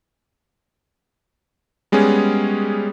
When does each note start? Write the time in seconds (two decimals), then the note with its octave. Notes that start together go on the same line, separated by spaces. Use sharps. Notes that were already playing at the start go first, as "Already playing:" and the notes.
1.92 G3 G#3 B3 C#4 G#4